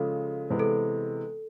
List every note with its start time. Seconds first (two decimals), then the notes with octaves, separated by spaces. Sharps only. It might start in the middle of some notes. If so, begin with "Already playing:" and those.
Already playing: C#3 F3 G#3 A4
0.50 C3 E3 G#3 B3
0.59 A4